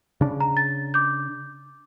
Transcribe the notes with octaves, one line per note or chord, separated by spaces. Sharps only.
C#3 D4
A#5
A6
D6 G6